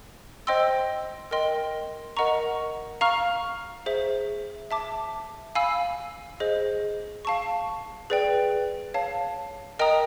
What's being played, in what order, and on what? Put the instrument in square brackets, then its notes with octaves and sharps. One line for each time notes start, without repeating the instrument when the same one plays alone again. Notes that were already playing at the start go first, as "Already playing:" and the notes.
[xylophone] C5 D#5 G5 C6 E6
A#4 D#5 G5 C6
A#4 D#5 F#5 A#5 C#6
F5 A#5 C#6 F6
G#4 C5 E5
E5 A5 D6
F5 G#5 B5 E6
G#4 C5 D#5
F5 A5 C#6
G#4 B4 D5 G5
C#5 F5 A5
A#4 D#5 G5 A#5 D#6